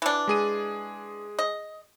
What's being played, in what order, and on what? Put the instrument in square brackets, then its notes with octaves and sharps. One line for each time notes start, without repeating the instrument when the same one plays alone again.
[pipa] E3 D4
[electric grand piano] G#3 G#4 D#7
[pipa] D#5